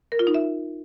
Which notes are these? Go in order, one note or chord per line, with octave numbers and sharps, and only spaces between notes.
A#4
F4
D#4
E5